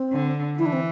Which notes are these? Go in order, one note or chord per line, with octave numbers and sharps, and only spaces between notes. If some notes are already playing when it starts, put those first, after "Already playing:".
Already playing: C4
D3
E3 E4
D4
C4